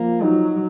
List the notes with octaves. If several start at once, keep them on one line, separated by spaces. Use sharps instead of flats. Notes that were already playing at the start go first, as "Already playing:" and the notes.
Already playing: F3 A#3
F#3 D#4